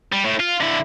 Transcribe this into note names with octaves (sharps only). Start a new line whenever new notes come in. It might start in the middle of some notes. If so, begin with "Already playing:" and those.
G3
A2
F4
D3 E4